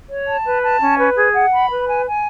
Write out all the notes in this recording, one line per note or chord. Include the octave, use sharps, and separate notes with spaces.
C#5
A5
B4
A5
C#4
B4
G#4
F#5
B5
B4
G#5
G#5